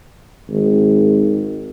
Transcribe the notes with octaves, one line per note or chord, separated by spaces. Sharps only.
G#1